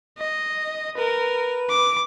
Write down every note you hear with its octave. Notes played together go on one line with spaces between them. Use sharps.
D#5
A#4 B4
D6